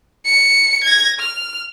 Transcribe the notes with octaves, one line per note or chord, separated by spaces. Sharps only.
C#7
G#6 A#6
F6